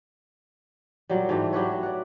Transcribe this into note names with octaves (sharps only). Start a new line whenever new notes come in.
A#2 F#3 G3
G#2 E3 A3 G4
F#3 G4 B4 C#5
D5 F#5